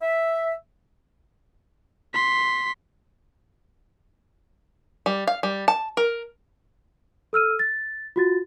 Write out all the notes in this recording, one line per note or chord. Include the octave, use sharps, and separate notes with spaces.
E5
C6 B6
G3
F5
G3
A5
A#4
A4 E6 F6 D#7
A6
F4 F#4 A6